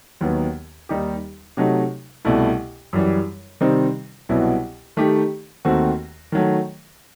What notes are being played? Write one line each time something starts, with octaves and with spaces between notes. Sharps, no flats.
D#2 D#3 F#3 B3
D#2 D#3 G3 D#4 G4
C3 F#3 A3 D#4
C2 B2 A3 E4
F#2 E3 G3
C3 D#3 G3 C4 D#4
C2 B2 F#3 B3 E4
D#3 A3 D#4 G4
D#2 D#3 A3 C4 F#4
D#3 F#3 A3